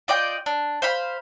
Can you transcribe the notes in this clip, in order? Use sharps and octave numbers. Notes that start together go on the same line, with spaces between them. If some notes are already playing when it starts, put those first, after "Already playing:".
F4 D5 D#5 G5
D4
C5 F5 B5